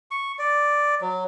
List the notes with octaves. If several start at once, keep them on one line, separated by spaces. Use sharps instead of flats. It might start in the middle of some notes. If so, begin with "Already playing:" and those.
C#6
D5
F#3